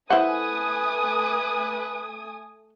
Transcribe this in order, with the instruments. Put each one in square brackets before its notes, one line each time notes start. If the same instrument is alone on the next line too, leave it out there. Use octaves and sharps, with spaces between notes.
[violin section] A3 G#5 D#6 [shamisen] E4 C5 F#5 [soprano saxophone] B4